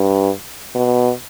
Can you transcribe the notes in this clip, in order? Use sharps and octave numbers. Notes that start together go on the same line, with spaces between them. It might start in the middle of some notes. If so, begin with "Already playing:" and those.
Already playing: G2
B2